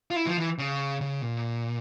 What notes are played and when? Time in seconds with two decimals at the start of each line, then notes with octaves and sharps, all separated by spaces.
0.11 F4
0.16 E4
0.27 F3
0.38 E3
0.58 C#3
1.01 C#3
1.22 A#2